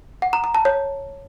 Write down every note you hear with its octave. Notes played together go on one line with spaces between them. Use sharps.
F#5
A#5
A#5
A5
C#5